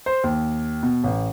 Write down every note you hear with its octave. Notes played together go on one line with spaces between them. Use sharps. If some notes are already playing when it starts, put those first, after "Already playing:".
C5
D#2
B2
A1